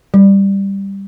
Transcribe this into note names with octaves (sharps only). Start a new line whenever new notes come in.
G3